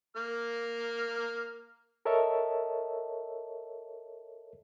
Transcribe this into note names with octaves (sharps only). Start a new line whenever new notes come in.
A#3 F6
A4 A#4 C#5 D#5 E5 A5